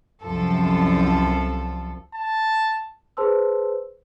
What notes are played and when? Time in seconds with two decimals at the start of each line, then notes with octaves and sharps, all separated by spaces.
0.23 C2 F#2 F3 A4
2.14 A5
3.17 G#4 B4 C5 A5 C6 E6